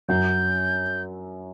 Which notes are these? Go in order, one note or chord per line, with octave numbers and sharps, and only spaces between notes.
F#2 F#3 G6